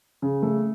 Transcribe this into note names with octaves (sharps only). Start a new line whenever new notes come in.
C#3
A3